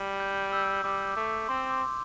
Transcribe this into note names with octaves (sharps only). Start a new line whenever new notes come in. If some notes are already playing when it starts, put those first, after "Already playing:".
Already playing: G3
G6
E6
G3 D6
A3 D6
C4 C6
D6